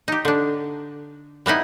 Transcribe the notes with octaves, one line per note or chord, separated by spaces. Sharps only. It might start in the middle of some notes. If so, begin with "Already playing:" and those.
D#4 G4
D3 D4
G3 B3 D#4 E4